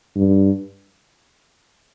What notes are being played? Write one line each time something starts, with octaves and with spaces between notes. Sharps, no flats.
G2